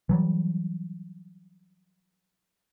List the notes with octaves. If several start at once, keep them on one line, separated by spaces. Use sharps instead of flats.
E3 F#3 G3